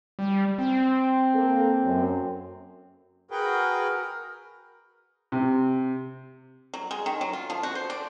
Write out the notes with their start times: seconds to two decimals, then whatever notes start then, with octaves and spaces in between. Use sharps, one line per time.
0.19 G3
0.58 C4
1.34 A#3 A4
1.83 F#2
3.31 F#4 G#4 A#4 B4 G5
3.91 A#4
5.32 C3
6.74 F#3
6.91 G#3
7.06 D#3
7.21 F#3
7.33 F4
7.50 F3
7.63 F#4
7.75 C5
7.90 D5